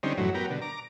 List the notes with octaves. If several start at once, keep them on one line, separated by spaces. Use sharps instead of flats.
D3 G3 C4 C#4 D#4
F#2 A2 E3 F#3
F#3 B3 G4 A#4
B2 D3
A#5 D6